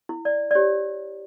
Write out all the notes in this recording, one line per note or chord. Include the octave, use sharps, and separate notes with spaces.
E4
D5
D5
G4 C#5